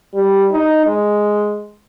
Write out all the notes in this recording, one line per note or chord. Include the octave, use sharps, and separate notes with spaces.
G3
D#4
G#3